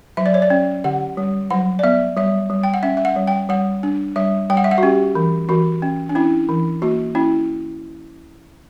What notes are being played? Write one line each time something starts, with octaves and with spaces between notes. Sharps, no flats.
F#3 E5
D5
C#5
D5
C#4
D3 F#5
G3
F#3 F#5
D5
B3 E5
G3 E5
G3
G5
F#5
C#4 E5
E5
F#5
G3
G5
G3 F#5
D4
G3 E5
G3 G5
F#5
E5
F#5
F#4
C#4 G4
E3
E3 F#4
C#4
D4
C#4 E4
E3
A#3 F#4
C#4 E4